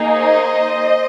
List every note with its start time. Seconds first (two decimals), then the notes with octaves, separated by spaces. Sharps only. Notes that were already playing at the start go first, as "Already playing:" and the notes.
Already playing: A#3 D#4 G#4
0.11 C5 D#5